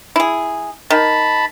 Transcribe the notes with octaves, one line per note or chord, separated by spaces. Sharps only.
E4 G#4
D#3 A5 B5